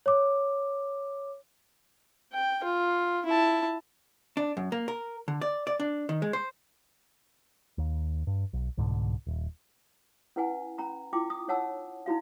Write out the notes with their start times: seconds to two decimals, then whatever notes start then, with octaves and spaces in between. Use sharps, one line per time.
0.06 C#5 D6
2.34 G5
2.64 F4
3.25 E4 A5
4.37 D4
4.57 F#2
4.72 A#3
4.88 A#4
5.28 D3
5.41 D5
5.67 D5
5.80 D4
6.09 D#3
6.22 G#3
6.33 C5
7.78 D#2
8.27 G2
8.53 B1
8.77 C2 G#2 B2 D3
9.27 D#1
10.36 C#4 E4 B4 F#5 G#5
10.78 C#4 A#5 B5
11.13 E4 F4 G5 D6
11.30 D#6
11.48 D#4 C#5 F#5 A5 E6
12.06 D#4 E4 F#4 F5